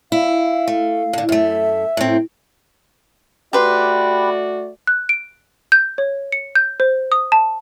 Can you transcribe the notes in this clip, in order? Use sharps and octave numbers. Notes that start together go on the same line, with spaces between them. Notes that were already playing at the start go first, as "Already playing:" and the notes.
E4 F5
A3
A2 D3
F#2 A3 E5
A2 C4
A3 F#4 G4 B4 D5 C6
F#6
D7
G6
C#5
C#7
G6
C5
D#6
A5